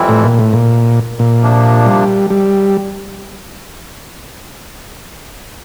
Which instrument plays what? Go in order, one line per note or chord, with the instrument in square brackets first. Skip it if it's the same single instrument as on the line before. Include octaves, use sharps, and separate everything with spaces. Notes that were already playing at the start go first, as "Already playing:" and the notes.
Already playing: [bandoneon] F2 E3 G3 C4 E4
[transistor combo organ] A2
A#2
A2
A#2
A#2
[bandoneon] C3 F3 A#3 D4
[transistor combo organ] G3
G3